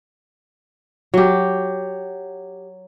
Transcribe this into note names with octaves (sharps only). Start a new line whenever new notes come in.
F#3 G4